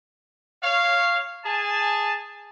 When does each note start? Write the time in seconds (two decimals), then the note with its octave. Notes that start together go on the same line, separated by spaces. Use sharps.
0.63 C#5 F5
1.45 G#4 G#5 A5